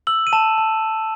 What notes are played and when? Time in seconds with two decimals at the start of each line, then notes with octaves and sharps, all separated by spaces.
0.07 E6 F#7
0.27 D#7
0.33 A5 E7
0.58 A5